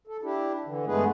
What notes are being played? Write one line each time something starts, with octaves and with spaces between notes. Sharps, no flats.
A4
D4 E4 G4
D3 E3
G2 G#3 A3 B3 G#4 B4